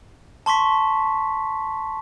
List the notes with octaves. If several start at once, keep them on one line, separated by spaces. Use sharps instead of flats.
A5 C6 C#6 B6